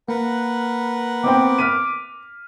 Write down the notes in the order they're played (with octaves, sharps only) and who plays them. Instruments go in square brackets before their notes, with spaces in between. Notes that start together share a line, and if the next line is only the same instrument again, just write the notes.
[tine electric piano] A#3 [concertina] A#4 B4 F#5
[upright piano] B3 C4 G5 [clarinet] D6
[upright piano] F6 B6 D#7